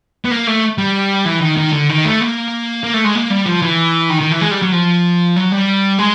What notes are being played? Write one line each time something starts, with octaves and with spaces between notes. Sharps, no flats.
B3
A#3
A3
G3
E3
D#3
D#3
D3
D#3
A3
A#3
A#3
A3
G#3
A#3
G3
F3
E3
D#3
D#3
E3
G#3
G3
F#3
F3
F#3
G3
G#3